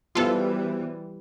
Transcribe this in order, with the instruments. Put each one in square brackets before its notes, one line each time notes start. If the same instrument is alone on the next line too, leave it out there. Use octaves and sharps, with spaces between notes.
[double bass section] E3 G3 [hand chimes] B3 F#4 C5 [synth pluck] F4 A4